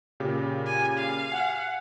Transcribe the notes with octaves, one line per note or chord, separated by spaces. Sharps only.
A#2 C#3 G4
G#5
F5
F#5 G#5